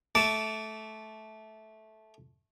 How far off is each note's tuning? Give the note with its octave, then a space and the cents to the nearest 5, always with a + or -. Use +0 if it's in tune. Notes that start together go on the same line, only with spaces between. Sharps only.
A3 -15 A5 +0 D6 -25